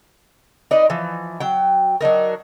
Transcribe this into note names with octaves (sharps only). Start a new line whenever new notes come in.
D#4 B4 D5 D#5
E3 F3
F#3 G5
F#3 D4 D#4 A#4